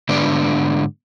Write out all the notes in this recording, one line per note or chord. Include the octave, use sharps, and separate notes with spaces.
G#2 D3 B3 D4